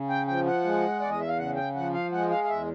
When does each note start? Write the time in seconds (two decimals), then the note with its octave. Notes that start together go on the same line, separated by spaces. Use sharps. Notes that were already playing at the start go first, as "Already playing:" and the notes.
Already playing: C#3
0.10 G5
0.27 F3 G5
0.46 F#5
0.64 G#3
1.00 E2 D5
1.10 D#5
1.20 E5
1.28 F5
1.37 C#3 F#5
1.56 G5
1.75 F3 F#5
1.94 F5
2.12 G#3 F#5
2.31 F5
2.44 F5
2.49 E2 E5